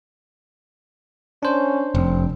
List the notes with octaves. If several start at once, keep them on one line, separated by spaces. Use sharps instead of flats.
C#4 D4 C5
F1 C4